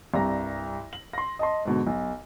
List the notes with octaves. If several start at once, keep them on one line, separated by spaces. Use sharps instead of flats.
C2 G2 A#5 A#6
F#7
C6 A#6
D#5 A5 C6
G#2 B2 D3
B1